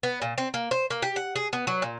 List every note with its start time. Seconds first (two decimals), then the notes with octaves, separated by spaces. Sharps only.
0.03 B3
0.22 A#2
0.38 C4
0.54 A#3
0.71 C5
0.90 A#3
1.02 G4
1.16 F#5
1.36 G#4
1.53 B3
1.67 F#3
1.82 A#2